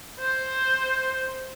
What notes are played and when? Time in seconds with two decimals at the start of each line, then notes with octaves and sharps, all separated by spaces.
0.20 C5